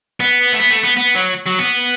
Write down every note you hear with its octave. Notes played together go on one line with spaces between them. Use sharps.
B3
A3
B3
A3
B3
B3
F#3
F#3
B3